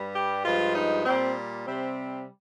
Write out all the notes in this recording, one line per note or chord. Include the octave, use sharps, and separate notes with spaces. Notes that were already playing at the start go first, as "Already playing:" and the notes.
Already playing: G2 G3
G4
G2 F3 G#3 F4
D#4
A#2 G3 C4
C3 G3 C4